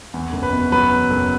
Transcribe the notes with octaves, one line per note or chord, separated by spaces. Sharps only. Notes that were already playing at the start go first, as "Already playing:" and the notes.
E2
F#1
B4
B2
F#3 B4
E2
F#1